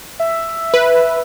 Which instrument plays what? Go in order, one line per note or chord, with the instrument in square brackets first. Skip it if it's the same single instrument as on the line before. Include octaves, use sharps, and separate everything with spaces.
[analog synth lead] E5
[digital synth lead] B4